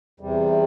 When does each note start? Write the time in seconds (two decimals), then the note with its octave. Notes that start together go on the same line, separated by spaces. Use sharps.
0.20 E2 C3 G3